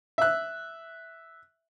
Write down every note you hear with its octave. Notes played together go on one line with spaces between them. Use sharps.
E5 F#6